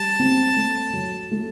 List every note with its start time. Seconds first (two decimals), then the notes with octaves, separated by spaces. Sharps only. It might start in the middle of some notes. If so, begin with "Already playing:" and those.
Already playing: G3 A5
0.20 C4
0.56 A3
0.93 F#3
1.31 A3